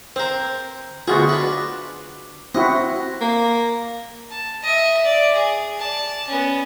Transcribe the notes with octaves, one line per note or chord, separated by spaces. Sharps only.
C4 A#4 C5
D2 B2 F4 F#4 G#4
D4 B4
C4 E4 F#4 D#5
A#3
A5
D#5 E5
D5
G#4
D5 A5
B3 C#4